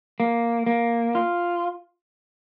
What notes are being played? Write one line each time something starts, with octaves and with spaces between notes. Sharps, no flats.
A#3
A#3
F4